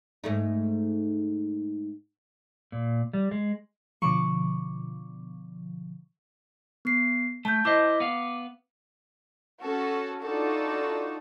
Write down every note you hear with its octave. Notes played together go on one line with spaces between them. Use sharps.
G#2 A3 D#4
A#2
G3
G#3
B2 D3 F3 C#6 D6
B3 C7
A3 A5 G6
E4 C5 D#5 D6
B3 F5
C#4 F#4 A4
D4 D#4 F4 F#4 A4